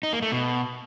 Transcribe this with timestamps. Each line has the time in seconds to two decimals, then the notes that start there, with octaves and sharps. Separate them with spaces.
0.03 D#4
0.13 A#3
0.22 A3
0.32 B2